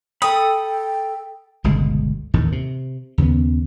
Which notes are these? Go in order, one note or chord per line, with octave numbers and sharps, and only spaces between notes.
A4 G5 B5 D#6
G1 C#2 B2 G#3
A1 D#2 A2 D#3
C3
D#2 C#3 G#3 B3